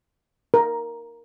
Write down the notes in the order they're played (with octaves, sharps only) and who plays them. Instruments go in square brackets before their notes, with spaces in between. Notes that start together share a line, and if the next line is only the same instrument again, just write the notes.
[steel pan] A#4